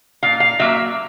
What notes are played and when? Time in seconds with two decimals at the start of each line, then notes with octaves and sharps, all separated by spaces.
0.23 A#2 F5
0.40 F5
0.59 F#3 A#3 E5